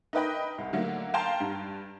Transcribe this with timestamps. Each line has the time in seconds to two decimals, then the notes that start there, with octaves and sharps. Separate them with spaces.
0.13 D#4 A#4 B4 D#5 G5 B5
0.58 C2
0.73 D3 F#3 A3 A#3
1.14 F5 G5 A5 A#5 C6
1.40 G2